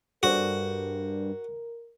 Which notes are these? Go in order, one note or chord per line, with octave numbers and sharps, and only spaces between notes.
G2 F#4 A4 A#4 C5 D5